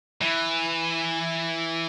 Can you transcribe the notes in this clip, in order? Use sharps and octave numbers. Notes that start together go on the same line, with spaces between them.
E3